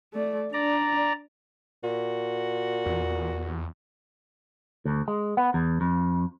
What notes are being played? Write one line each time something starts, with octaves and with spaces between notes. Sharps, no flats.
A3 D5
D4 D5 A#5
A#2 F#4
E2
D2
G#3
B3
E2
F2